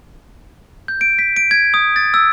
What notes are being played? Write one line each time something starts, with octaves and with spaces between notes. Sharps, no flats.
G6
D7
B6
D7
G#6
D#6
A6
E6